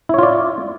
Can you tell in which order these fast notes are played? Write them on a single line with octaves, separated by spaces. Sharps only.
E4 C#5 F4 D5